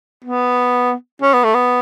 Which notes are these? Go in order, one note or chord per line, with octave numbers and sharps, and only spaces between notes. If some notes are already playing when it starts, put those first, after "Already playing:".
B3
C#4
B3
A3
B3